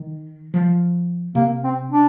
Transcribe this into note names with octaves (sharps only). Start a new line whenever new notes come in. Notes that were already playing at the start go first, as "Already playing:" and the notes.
Already playing: D#3
F3
C3 A#3
C4
D4